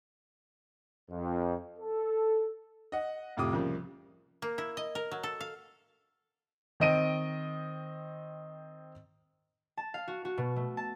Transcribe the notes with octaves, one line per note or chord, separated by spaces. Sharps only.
F2
A4
D#5 F#5
F2 A2 C3 F4 D6 D#6
C2 C#3 F3 A#3
A#3
E4
D#5
A#4
F#3
A4
F5
D#3 C4 D#5 D7 D#7
A5
F5
F#4
F#4
B2
A3
A5